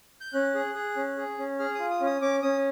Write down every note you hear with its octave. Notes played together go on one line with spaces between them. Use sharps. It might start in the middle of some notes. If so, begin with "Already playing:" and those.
G6
C#4 F#6
G#4
G#4
C#4
G#4
C#4
G#4 F6
F4 D#6
D#6
C#4
D#6
C#4 D6
C#4 D#6